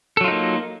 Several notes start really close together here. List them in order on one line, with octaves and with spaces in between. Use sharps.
A4 F#3 F4 D#4 A#3